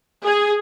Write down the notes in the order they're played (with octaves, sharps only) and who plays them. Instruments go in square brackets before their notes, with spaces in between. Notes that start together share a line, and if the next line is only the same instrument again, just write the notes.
[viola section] G#4